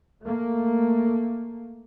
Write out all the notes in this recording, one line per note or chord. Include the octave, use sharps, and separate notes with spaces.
A3 A#3